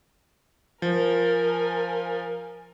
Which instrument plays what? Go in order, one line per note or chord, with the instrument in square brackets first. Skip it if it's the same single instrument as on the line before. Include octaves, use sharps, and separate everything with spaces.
[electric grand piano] F3 [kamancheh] A#4 G#5